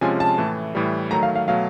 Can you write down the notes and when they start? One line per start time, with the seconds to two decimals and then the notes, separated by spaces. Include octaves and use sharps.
0.01 C3 F3 G#3 C#4 F4 G#5
0.20 A5
0.38 A2 E3 A3
0.75 A2 E3 G3
1.11 D#3 F#3 A3 A#5
1.23 F5
1.35 F5
1.47 B2 F#3 A3 F5